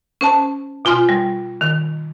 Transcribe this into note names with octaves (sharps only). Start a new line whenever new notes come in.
C#4 C5 A5
B2 F4 G#5 C6 F6
G3
D#3